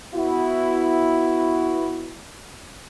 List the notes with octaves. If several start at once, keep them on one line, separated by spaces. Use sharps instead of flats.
B3 E4 F#4